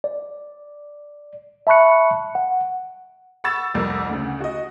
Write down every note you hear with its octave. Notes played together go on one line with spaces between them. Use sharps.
D5
E5 A5 B5 C#6 F#6 C#7
F#5
F#5 B5 C#6 E6 A6 E7
F1 C2 F2 G3 A#4 E6
D2 C#3
F#4 D#5